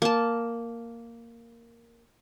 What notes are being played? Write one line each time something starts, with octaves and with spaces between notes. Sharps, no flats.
A#3 A5